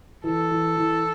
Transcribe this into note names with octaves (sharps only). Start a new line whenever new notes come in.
E3 A4
E3
E3